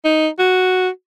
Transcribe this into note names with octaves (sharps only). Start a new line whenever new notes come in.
D#4
F#4